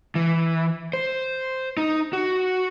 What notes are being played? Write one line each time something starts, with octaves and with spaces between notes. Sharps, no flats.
E3
C5
D#4
F#4